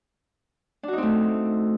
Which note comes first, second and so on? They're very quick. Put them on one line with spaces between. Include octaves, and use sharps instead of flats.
D4 F#4 D#4 C4 A3